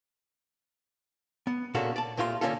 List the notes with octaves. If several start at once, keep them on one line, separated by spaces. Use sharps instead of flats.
B3
A#2 C#3 A#3 D4 F#4 A4
D5 A5
C2 A#2 A3 F4 B5 C6
D3 F3 A#3 C#4 F4 A4